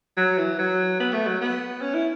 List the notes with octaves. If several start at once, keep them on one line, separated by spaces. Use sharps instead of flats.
F#3
E3
F#3
B3
A3
F#3
B3
C#4
E4